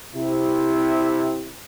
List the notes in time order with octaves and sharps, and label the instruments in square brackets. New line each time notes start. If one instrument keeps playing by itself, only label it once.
[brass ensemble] C3 E4